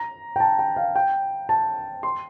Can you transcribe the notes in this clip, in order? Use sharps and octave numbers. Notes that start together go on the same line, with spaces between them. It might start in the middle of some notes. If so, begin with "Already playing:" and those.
Already playing: A#5
G5
A5
G5
F5
G5
A5
C6